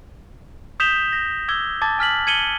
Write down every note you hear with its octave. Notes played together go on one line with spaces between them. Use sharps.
D#6 G6 B6 E7 F7 G7
A#6
D6 E6 G#6 G7
A5 D6 G#6 A6
G#5 F6 B6 F#7
G#6 C#7 D#7 F#7 G7